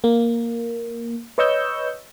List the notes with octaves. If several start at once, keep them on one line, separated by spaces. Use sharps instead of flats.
A#3
B4 C#5 D#5 C#6 E6 G6